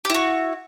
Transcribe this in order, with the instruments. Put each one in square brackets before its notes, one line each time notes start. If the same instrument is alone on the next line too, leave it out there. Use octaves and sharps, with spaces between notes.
[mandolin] G4
E4
F#4